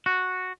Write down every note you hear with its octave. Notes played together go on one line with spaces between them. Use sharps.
F#4